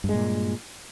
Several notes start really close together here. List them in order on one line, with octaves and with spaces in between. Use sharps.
G2 G#3 A#2